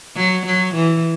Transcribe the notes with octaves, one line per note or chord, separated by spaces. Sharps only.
F#3
F#3
E3